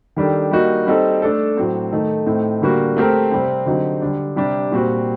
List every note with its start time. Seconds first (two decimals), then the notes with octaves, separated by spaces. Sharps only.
0.16 D#3 G3 D4 A4
0.51 G3 A#3 D#4 F#4
0.87 G3 C4 D#4 A4
1.22 A3 D4 A4
1.57 A2 F#3 C4
1.91 D#3 A3 D#4 A4
2.26 A2 A3 C4 D#4
2.61 D3 G3 A#3 F#4
2.96 A3 C4 G4 A#4
3.31 C3 G3 C4
3.66 D3 F#3 C4 D#4 G4
4.01 D3 G3 D4
4.36 C3 G3 D4
4.72 A#2 G3 C4 F#4